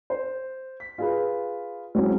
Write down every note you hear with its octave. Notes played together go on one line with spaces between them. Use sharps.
C5
B6
F4 G#4 B4
F#3 G#3 C4 C#4 E4 F#4